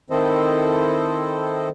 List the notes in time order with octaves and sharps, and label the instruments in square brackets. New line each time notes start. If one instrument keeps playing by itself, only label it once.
[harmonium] D#3 C4 E4 A4 C5 D#5